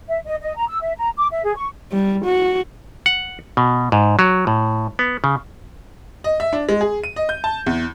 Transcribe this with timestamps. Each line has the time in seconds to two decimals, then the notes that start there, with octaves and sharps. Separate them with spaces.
0.08 E5
0.26 D#5
0.42 D#5
0.57 A#5
0.69 E6
0.81 E5
0.98 A#5
1.17 D6
1.31 E5
1.44 G#4
1.57 C#6
1.92 G3
2.25 F#4
3.06 F#5
3.57 B2
3.92 G#2
4.19 F#3
4.47 A2
4.99 B3
5.24 C#3
6.24 D#5
6.40 E5
6.53 D4
6.69 G#3
6.81 G#4
7.04 D#7
7.16 D#5
7.29 G6
7.44 A5
7.66 E2